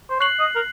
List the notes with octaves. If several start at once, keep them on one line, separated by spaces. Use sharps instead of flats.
C5
C#5 F#6 C7 F#7
D#5
A#4